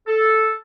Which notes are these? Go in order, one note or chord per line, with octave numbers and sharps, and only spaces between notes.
A4